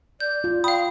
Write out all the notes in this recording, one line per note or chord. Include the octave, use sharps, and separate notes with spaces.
D5 G6
F4
F5 G5 B5 D#6